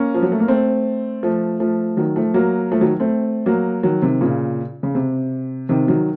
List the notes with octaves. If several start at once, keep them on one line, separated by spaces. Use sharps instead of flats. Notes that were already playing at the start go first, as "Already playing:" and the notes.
Already playing: A#3 C#4
F3
F#3
A3
A#3
A3 C4
F3 A3
F3 A3
D#3 F#3
F3 A3
F#3 A#3
F3 A3
D#3 F#3
A3 C4
F#3 A#3
D#3 F#3
C3 D#3
A#2 C#3
C#3
C3
C3 D#3
D#3 F#3